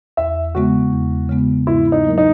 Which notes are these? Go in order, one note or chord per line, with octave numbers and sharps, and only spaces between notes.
E2 E5
C#3 G#3 B3 F#4
E2
C#3 G#3 B3
G#2 E4
D#4
F#3 A#3 E4 A#4
D#4